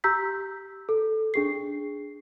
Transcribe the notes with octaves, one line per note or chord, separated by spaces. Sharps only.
G4 A#5 E6 G6 B6
A4
D4 G#4 C7